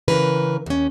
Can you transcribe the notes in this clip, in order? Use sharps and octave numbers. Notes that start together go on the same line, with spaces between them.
C#3 E3 A#4 B4
D#2 C#4